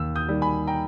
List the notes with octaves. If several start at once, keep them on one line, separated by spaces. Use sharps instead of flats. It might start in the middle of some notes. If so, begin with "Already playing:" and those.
Already playing: D#2 E6
D#6 G6
D#3 G3
G#5 B5
G5 A#5